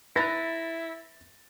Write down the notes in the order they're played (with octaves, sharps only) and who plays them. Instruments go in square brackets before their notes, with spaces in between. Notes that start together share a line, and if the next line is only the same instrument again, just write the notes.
[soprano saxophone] E4 [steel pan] B4 A#5 [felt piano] A6 A#6